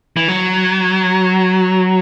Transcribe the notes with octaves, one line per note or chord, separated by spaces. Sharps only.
E3
F#3